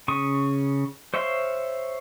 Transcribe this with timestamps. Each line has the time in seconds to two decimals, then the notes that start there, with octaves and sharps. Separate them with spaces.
0.08 C#3 C#6 D#6
1.14 C5 C#5 E5 F5 C6